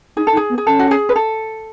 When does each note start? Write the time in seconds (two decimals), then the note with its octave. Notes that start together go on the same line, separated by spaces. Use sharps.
0.16 D#4 G#4
0.27 A4
0.32 D#4
0.37 G#4
0.50 B3
0.58 G#4
0.66 C#4 A4
0.79 F#4
0.91 G#4
1.09 B4
1.16 A4